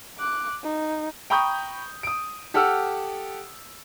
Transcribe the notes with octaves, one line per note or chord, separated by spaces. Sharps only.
D6 F#6
D#4
G5 A#5 B5 C#6 D#6 G6
D#6 D7
G4 A4 F#5 E6 F6